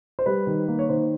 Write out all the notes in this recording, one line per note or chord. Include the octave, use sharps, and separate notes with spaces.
C5
G3 B4
D#3
A#3
C#5
D#3 C5